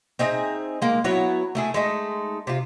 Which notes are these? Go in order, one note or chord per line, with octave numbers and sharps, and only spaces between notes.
C4 D#4 G#4 E5
G#3 A#3
F#3 B3 E4 C#5
A3 E4 G#4
G#3 A3 D#4
C3 F4